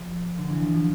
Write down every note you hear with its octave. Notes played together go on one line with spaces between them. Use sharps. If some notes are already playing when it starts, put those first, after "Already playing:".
Already playing: F3
D3
E3
F3
F3